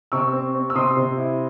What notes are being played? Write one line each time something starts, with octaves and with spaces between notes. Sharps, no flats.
C3 C#6 E6
C4
C4
E6
C3 C6 D#6
C3
E4